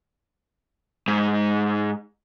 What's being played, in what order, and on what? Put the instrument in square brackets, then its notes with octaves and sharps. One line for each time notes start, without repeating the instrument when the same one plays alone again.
[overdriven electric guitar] G#2